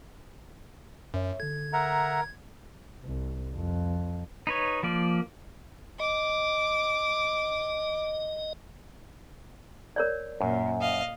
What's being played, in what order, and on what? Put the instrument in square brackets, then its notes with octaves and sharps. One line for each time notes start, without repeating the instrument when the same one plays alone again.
[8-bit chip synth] F#2 [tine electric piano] C#5 E5
[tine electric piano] D3 A4 [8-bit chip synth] G#6
[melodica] A#4 [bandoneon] E5 F#5 A#5
[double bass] C2
F2
[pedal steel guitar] D#4 B4 C#5
F3 A#3 D5
[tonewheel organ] D#5 [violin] D6
[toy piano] A#4 C#5 D5
[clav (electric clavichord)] F#2 [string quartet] A#2
[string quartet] D#5 F5